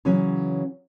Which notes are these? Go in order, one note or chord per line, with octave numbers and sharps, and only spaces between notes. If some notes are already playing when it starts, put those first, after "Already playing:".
C#3 E3 F#3 C#4